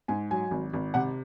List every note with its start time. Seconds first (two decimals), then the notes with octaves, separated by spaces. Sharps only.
0.08 G#2 G#5
0.31 F#3 G#5
0.51 G#1
0.73 G#1
0.94 C3 F#5